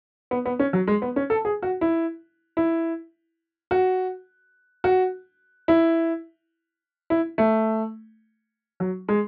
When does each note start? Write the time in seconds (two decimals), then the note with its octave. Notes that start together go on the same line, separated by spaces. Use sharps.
0.31 B3
0.46 B3
0.59 C#4
0.73 F#3
0.87 G#3
1.02 B3
1.16 C#4
1.30 A4
1.45 G#4
1.62 F#4
1.81 E4
2.57 E4
3.71 F#4
4.84 F#4
5.68 E4
7.10 E4
7.38 A3
8.80 F#3
9.08 G#3